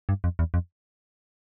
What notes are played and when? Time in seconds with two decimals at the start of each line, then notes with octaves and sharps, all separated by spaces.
0.09 G2
0.24 F2
0.39 E2
0.54 F2